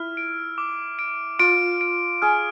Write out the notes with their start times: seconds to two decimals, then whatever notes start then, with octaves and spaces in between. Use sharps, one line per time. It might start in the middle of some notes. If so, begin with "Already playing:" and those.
Already playing: E4 F6
0.17 D7
0.58 D6
0.99 D7
1.39 F4 D7
1.81 D7
2.22 G#4 F6